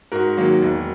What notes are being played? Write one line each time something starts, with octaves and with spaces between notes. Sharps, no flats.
G#2 F#4 A#4
D#3 F#3 A#3
E1